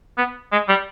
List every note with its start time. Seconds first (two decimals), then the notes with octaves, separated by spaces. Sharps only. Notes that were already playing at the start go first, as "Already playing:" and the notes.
0.18 B3
0.52 G#3
0.69 G3